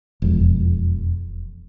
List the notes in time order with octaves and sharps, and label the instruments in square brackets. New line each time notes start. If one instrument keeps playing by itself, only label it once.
[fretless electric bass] E1 F2